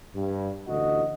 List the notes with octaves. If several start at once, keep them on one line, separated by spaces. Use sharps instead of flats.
G2
A1 D2 F#4 D#5